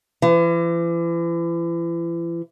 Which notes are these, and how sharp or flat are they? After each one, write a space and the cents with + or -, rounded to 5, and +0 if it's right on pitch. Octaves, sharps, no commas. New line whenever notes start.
E3 +40